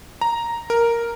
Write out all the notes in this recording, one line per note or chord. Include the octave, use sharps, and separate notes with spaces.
A#5
A#4